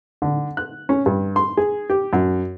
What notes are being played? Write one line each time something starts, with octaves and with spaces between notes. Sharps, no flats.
D3
F#6
C#4
G2
C6
G#4
G4
F#2